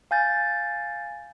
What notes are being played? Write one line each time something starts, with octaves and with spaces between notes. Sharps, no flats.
F5 G#5 G6 A6